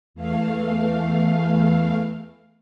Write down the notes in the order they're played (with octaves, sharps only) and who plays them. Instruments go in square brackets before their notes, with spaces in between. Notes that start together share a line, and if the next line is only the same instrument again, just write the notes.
[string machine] E2 E3 A3 F5